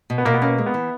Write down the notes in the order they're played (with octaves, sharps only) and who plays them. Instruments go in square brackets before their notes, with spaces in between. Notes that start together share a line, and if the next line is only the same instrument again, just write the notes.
[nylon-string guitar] B2
[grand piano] B3
[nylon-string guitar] B2 [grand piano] A#3
[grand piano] B3
[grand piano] A#3 [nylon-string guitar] C#4
[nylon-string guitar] G#3
[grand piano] B3
[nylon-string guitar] E3